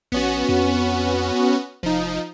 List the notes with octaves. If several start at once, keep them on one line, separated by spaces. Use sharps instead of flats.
A#1 B3 C#4 F#4
F2
F1 F3 D#4